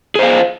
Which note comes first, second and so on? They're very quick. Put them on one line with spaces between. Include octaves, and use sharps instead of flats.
G#4 C5 F5